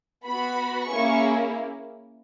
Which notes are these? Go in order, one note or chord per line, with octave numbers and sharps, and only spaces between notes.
B3 F#4 B5
A#3 C#4 E4 G#4 C#6